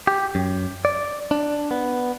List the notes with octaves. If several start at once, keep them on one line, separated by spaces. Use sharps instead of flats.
G4
F#2
D5
D4
B3